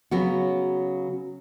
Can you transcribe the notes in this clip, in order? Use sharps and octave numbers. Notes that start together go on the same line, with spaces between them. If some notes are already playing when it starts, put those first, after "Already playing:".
C#3 F#3 B3 F#4